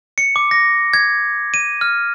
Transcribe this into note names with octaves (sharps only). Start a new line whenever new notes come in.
C#7
D6
A#6
G#6
D#7
F6